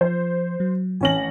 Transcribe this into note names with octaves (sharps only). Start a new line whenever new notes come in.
F3 C5
F#3
A1 C#4 G#5 A5 A#6 F#7